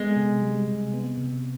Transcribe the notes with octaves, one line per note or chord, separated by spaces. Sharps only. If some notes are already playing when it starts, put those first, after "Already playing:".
Already playing: G#3 B3
C3
G3
C3
B3
C3